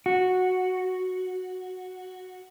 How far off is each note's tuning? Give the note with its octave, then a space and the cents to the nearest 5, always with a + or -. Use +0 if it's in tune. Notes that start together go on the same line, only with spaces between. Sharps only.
F#4 -5